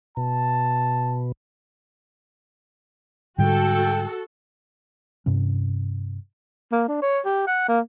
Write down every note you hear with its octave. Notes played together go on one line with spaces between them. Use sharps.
B2 A5
G#2 D3 G3 F#4 A4 G5
G2 C3 C#4
A#3
D4
C#5
G4
F#5
A#3